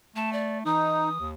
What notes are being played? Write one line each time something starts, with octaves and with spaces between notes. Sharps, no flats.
A3 A5
D5
E3 D#4 D#6
D#2